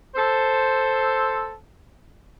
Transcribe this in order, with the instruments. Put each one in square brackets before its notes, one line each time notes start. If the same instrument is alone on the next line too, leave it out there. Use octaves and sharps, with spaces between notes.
[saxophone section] A4 C5